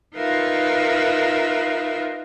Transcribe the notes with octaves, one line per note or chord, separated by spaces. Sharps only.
D#4 F4 A#4 B4 E5 F5